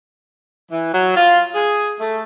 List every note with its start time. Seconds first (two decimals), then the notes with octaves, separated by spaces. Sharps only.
0.71 E3
0.94 F#3
1.17 F4
1.54 G#4
2.01 A3